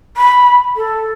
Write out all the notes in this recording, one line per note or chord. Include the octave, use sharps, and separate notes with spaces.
B5
A4